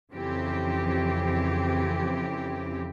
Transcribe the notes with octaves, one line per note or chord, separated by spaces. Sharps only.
F2 C#3 E3 C4 G4